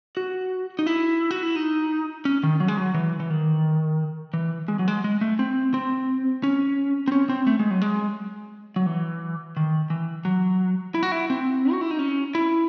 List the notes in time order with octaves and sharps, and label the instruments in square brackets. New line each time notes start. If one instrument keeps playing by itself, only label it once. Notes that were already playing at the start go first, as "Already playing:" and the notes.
[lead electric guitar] F#4
D#4
E4
F#4
E4
D#4
C#4
D#3
F#3
G#3
F#3
E3
E3
D#3
E3
G#3
F#3
G#3
G#3
A3
C4
C4
C#4
C4
C#4
C4
A3
G#3
F#3
G#3
F#3
E3
D#3
E3
F#3
E4
F#4
E4
C4
F#4
E4
D#4
C#4
E4